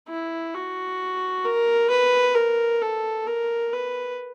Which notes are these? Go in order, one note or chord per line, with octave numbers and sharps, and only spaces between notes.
E4
F#4
A#4
B4
A#4
A4
A#4
B4